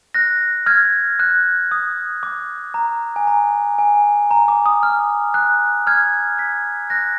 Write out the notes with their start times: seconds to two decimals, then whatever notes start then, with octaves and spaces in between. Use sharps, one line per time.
0.14 F#6 A#6
0.66 F6 G#6
1.19 F#6
1.71 D#6
2.23 D6
2.74 A#5
3.16 G#5
3.27 A#5
3.79 G#5
4.31 A#5
4.48 D6
4.66 D#6
4.83 F6
5.34 F#6
5.87 F6 G#6
6.38 G#6 B6
6.90 F#6 A#6